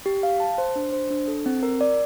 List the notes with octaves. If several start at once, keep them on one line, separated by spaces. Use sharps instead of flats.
G4
F5
A5
C5
D4
C5
D4
A4
C4
A#4
D5